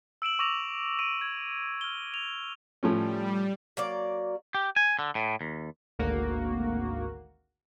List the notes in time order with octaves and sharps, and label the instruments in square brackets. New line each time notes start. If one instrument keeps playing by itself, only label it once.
[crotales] E6 D7 E7 F#7
C#6 D6 E6 A#6 F7
D6 D7 D#7
G#6
F6 G7
F7
[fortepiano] A2 F3 C#4 [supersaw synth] G3
[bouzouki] F#3 A#3 D5
[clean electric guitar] G4
G#5
D3
A2
D#2
[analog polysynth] G#1 D2 A#3 F#4